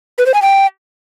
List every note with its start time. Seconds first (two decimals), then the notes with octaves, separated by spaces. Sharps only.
0.18 B4
0.26 C5
0.34 G#5
0.42 G5